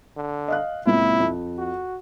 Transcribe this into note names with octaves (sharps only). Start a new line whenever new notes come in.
D3
D#5 F5 F#6
C#2 A#2 C4 E4
F2
F#4